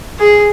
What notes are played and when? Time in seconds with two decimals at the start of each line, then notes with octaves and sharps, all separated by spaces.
0.19 G#4